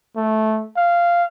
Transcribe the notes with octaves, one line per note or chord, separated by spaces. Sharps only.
A3
F5